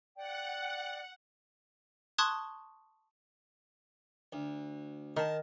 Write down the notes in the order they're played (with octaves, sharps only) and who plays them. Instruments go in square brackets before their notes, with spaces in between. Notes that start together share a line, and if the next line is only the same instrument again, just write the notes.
[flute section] D5 G5 [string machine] F#5
[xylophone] A5 C6 C#6 D#6 F#6 G#6
[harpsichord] D2
[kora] D#3 [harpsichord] A#4 A5